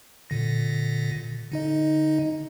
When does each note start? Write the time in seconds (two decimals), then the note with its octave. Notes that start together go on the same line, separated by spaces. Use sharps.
0.30 A#2 D3 A#6
1.52 D3 D#4 D#5